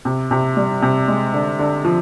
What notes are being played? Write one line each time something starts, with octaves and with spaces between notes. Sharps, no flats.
C3
C3
G3
C3
G#3
D3
D3
F3